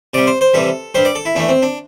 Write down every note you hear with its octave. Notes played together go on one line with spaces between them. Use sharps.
C3 G3 D5
C5
C5
C3 E3 G3 A4
G2 G3 C5
D5
A4
E4
E2 E3 A3 D4
C4
D4